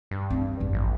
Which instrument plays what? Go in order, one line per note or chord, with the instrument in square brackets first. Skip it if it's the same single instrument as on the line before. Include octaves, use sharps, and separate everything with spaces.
[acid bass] G2
[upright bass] C4 D#4
G1 F2
[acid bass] A1